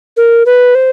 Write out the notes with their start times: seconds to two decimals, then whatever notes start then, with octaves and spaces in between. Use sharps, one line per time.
0.17 A#4
0.46 B4
0.75 C5